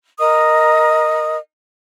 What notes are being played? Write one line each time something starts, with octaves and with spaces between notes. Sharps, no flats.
A#4 D#5 D#6